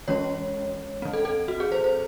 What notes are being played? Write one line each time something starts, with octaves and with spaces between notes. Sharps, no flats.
E3 G#3 C#4 C#5
E3 C4
A4
A4
F#4
G#4
C5
C5